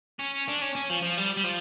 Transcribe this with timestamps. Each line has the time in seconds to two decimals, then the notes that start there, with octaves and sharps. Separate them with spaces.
0.19 C#4
0.48 D4
0.62 C#4
0.75 C#4
0.90 F3
1.03 F3
1.18 G3
1.37 G3
1.44 F3